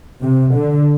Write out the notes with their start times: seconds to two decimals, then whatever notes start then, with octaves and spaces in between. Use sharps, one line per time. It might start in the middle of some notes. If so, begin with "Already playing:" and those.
0.22 C3
0.54 D3